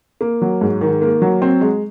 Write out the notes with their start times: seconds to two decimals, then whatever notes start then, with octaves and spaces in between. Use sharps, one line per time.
0.21 A#3
0.42 F#3
0.61 G#2
0.81 D#3
1.02 A#3
1.22 F#3
1.42 C4
1.61 G#3